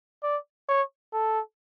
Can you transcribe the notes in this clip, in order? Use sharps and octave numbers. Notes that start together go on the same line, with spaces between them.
D5
C#5
A4